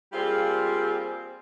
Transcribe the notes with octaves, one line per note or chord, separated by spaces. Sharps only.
G3 A#3 C4 F4 G#4